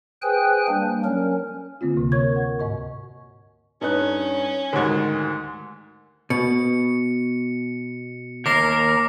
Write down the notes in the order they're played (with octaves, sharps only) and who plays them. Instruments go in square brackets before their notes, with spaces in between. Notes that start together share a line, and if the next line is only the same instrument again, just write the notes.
[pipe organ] G#4 B4 C5 G5 G#5 F#6
G3 A#3 D4
F#3 C#4 A#4
[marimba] D3 A#3 C4 F4
D2 C3
A#4 C#5 C#6 G#6
A#4 F#5
G#2 D#5 C#6
[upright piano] G2 D#4 F#6 [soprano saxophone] C#4 [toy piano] A4 B4 C#5
[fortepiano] D2 G#2 [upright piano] D#3 [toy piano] F#4 G4 C5
[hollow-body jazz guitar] B2 [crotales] C#7
[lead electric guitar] D#2 A#4 [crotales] D6 A#6 C7